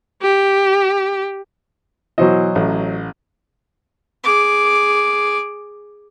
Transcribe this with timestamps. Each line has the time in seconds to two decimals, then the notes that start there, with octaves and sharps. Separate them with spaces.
0.22 G4
2.18 B2 E3 F#3 C5 D#5
2.55 A1
4.24 G#4 D6